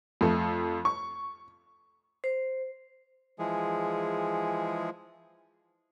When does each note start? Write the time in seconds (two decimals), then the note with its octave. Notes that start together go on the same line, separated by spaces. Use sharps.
0.21 F2 A3
0.85 C#6
2.24 C5
3.39 E3 F3 G#3 G#4